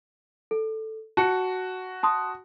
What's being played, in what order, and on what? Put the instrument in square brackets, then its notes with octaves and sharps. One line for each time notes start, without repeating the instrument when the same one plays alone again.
[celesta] A4
[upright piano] F#4 [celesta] A5 C#7
[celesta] A5 C6 D#6